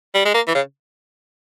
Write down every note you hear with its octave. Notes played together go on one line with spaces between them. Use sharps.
G3
G#3
A#3
E3
C#3